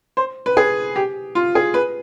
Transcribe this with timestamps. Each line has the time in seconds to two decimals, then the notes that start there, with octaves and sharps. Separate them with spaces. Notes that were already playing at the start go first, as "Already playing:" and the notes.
0.17 C5
0.46 B4
0.57 G#4
0.96 G4
1.35 F4
1.55 G#4
1.74 B4